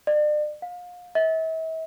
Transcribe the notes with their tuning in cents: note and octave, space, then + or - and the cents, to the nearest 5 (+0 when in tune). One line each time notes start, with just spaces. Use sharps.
D5 +35
F5 +35
E5 -40